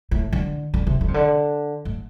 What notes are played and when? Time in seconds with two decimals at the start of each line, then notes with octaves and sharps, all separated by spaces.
0.11 A2
0.33 D3
0.74 D3
0.87 C3
1.01 D3
1.08 C3
1.14 D3
1.85 A2